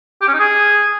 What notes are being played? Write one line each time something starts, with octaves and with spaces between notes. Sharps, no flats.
G4
C#4
D#4
G#4